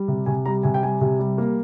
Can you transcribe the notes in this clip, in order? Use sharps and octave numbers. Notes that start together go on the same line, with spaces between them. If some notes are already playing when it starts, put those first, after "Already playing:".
Already playing: G3
C3
C3 G#5
G3 A#5
C3 G#5
G5
G3 G#5
C3
G3
A#3